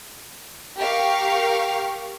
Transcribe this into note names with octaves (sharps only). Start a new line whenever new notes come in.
G4 A#4 F5 C#6